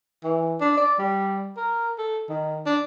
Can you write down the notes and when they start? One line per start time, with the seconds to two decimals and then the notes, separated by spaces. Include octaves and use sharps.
0.24 E3
0.60 D4
0.77 D5
0.99 G3
1.57 A#4
1.98 A4
2.29 D#3
2.66 D4